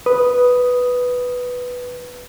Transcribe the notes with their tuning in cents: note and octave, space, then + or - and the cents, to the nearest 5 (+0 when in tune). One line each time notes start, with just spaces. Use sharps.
B4 +0 D#6 +0